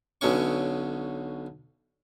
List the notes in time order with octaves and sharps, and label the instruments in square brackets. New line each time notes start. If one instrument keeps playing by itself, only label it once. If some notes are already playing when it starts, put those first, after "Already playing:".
[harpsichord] B1 B2 D3 C#4 C#6